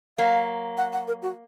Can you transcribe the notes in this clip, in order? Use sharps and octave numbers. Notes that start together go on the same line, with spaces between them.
F#3 A#3 F5
F#5
F#5
A#4
F#4